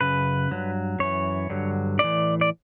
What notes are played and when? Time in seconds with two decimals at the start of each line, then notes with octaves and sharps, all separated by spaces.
0.01 F#2 C#3 B4
0.51 G2 F#3
0.99 F#2 E3 C#5
1.50 G2 D3 F#3
1.99 A2 E3 D5
2.41 D5